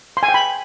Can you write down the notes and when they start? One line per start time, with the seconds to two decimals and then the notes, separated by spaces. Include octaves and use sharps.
0.17 C6
0.23 G#5
0.28 G5
0.34 B5